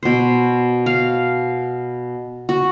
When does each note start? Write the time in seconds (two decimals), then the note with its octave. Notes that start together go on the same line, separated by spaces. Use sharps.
0.03 B2 C5
0.86 F5
2.49 F#4